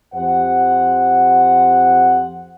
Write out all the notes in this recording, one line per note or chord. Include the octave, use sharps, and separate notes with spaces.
F2 G4 C5 F#5